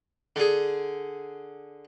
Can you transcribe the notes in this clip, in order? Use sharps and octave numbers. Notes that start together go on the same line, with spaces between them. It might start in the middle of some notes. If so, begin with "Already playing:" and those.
D3 G#4